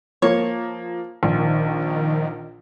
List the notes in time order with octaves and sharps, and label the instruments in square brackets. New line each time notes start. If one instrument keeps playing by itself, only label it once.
[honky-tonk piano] F3 A#3 [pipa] C#5
[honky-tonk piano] A#1 [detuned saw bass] D#3